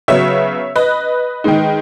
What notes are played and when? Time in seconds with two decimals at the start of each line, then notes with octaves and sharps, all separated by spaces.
0.08 C#3 F#3 B3 C#5 E5
0.76 B4 D#5
1.44 D#3 G#3 D#4